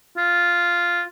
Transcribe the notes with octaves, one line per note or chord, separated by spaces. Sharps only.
F4